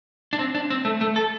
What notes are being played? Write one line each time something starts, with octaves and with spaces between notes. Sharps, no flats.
D4
C4
D4
C4
A3
A3
A4